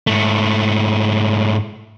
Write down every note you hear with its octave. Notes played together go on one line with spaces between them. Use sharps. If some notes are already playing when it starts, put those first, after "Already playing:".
G#2 A3